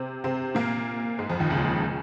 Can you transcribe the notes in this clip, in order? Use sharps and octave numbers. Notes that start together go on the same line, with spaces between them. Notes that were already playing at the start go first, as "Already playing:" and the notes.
Already playing: C3 C4
C3 C4
A#2 A#3
G#2 G#3
F2 F3
D#2 D#3
C#2 C#3
C#3